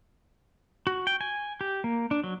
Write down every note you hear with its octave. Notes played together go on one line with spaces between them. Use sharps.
F#4
G5
G#5
G4
A#3
D4
F#3